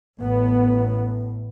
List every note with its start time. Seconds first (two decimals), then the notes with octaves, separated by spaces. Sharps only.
0.21 A1 A2 B3